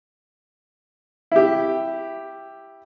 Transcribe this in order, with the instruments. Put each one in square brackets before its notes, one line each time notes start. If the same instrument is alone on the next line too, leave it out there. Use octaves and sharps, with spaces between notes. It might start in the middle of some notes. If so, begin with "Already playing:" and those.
[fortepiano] E4 G4